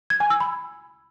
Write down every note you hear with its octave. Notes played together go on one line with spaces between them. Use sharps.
G#6
G#5
E6
B5